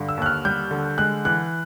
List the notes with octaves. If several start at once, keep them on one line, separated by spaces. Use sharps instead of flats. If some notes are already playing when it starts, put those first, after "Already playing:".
Already playing: G2 D3
E6
D#2 F#6
F6
G3 G6
D3
G#3 F#6
E3 F#6